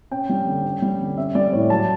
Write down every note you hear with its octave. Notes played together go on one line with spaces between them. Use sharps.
C#4 G5
G3
D3
C#4
G3
D3
C#4 E5
G3 D5
A2 C#5
F#3 A5